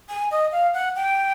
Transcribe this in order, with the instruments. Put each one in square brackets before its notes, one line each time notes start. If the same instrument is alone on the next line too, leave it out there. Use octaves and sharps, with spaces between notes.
[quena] G#5
D#5
F5
F#5
G5